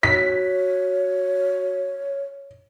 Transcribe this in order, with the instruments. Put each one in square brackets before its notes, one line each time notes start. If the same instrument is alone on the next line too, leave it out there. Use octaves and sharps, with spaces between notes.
[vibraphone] F#4 [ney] C#5 [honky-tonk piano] B6